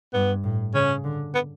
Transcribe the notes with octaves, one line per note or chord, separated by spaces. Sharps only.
G2 B3
A2
C#3 C#4
D3
B3